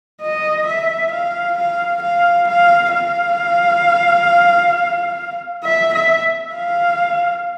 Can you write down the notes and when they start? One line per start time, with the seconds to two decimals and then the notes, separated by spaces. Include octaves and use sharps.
0.21 D#5
0.67 E5
1.12 F5
1.57 F5
2.02 F5
2.47 F5
2.93 F5
5.64 E5
5.94 E5
6.54 F5